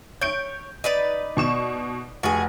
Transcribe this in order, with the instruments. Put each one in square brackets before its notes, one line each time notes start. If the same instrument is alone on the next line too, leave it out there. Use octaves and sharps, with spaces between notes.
[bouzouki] C#5 [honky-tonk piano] G6 D7
[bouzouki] D#4 B4 D5
[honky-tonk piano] B2 C#6 E7
[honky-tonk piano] F1 [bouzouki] F#4 G#4